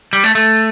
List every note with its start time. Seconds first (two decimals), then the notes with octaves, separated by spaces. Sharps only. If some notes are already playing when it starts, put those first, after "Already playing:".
0.13 G3
0.24 A3
0.35 A3